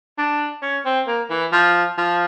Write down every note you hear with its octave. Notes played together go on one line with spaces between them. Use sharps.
D4
C#4
C4
A#3
E3
F3
F3